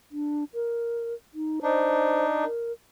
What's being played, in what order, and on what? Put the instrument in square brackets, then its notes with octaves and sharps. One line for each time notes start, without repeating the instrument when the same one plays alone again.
[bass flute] D4
A#4
D#4
[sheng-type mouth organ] D4 D#4 [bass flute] C5
[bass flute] A#4